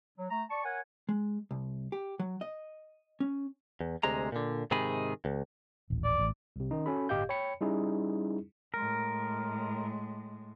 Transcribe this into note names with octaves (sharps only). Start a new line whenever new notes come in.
F#3
A3 A#5
D5 A5 C#6
A#4 C#5 F#5 G#5
G#3
C2
G4
F#3
D#5
C#4
E2
D2 C3 G#3 A#5
A#2 D3
G#2 C3 D#3 D#4 G#4 B5
C#2
D#1 A1
D5
A1
C2 C3
D#3 C#4 D#4
C#4 F#4 A4 B5
G1 A2 G4 D#5 F5 G6
C#5 G5 B5 C#7
G3 C#4 D#4 E4 G#4
A2 G#3 A#4